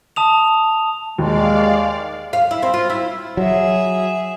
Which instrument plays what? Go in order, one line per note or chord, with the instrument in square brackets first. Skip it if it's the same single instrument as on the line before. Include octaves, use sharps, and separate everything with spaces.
[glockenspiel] A5 D#6 F7
[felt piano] D#2 [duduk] G#3 [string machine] D5 F5
[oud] F5
E4
C4
F4
E4
[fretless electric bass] F#3 [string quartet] G#4 E5